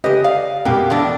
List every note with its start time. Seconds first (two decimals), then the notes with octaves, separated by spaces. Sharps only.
0.04 C#3 G4 B4 D#5
0.24 D5 F5
0.65 B2 A#3 B3 G4
0.90 E2 A2 D4